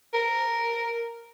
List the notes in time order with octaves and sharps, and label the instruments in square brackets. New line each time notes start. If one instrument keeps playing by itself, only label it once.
[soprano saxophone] A#4